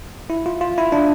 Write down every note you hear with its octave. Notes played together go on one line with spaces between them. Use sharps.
E4
F4
F4
E4
D4